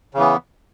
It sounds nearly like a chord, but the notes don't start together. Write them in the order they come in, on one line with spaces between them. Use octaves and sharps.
C#3 E3 B3